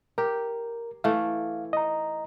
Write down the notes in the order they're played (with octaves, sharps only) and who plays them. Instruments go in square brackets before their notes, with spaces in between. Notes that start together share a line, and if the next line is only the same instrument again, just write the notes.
[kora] G4 [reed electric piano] A#4
[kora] E3 A3 [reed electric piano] F5
[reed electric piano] D#5 A#5